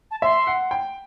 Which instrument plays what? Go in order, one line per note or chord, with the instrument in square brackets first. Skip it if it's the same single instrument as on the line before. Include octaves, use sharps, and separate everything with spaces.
[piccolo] A5
[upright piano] E5 [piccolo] C6
[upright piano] F#5
G5